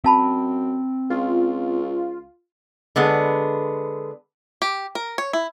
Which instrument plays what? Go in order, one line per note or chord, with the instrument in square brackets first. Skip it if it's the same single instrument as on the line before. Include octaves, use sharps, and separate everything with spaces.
[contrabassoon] F#2 [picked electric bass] C4 [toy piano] F5 A5 B5
[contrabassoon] C#2 [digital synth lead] F4
[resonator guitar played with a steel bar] D3 G#3 B3
[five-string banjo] G4
A#4
C#5
E4